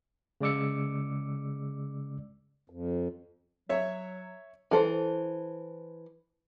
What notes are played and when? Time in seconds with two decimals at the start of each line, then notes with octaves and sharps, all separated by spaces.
0.41 C#3 G#3 D5 D6 E6 C#7
2.70 F2
3.69 F#3 C#5 E5
4.71 E3 A4 C5